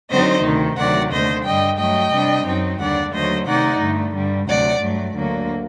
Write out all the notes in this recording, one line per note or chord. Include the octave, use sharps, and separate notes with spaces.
D3 F#3 C4 D#4 C5 D#5
D2 C3 D#3
D2 C3 D#3 F#3 D5 F#5
D#2 D3 A3 C5 D#5
G2 D3 G3 D#5 G5
G2 F#3 A3 D#5 G5
C3 G3 D4
F#2 F#3 C4 D#4
D#2 D3 G3 D4 D5 F#5
D#2 D3 F#3 A3 C5 D#5
C3 D#3 A3 D#4 D5 F#5
G2 D3 A3
G2 D3 G3
D2 C3 F#3 D5 F#5
G2 F#3 A3
D2 D3 F#3 A#3